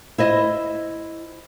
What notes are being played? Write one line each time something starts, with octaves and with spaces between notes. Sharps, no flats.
E4 C5 D#5